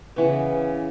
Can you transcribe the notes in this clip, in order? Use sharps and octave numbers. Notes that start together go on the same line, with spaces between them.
C#3 E3 B3